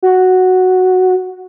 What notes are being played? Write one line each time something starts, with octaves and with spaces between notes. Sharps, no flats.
F#4